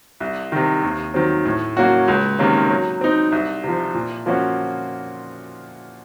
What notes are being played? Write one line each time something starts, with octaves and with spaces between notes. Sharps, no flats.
C2
C3 D#3
D#2
D#3 F#3 C4
A2
F#3 A#3 C#4 F#4
C#2
C3 D#3 A#3 C#4
F#3
C4 D#4
C2
C3 F3
A#2
F3 A#3 C#4 F#4